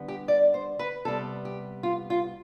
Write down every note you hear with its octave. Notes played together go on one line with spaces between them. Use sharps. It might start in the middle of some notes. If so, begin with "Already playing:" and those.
Already playing: D3 G3 B3
G4
D5
C5
B4
C3 G3 B3 A4
G4
F4
F4